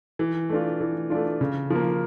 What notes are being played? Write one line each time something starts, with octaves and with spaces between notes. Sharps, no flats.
E3
A3 D4 F4
E3
A3 D4 F4
C#3
F3 A#3